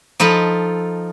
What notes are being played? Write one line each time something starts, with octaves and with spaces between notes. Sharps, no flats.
F3 D#4 F4 A4 B5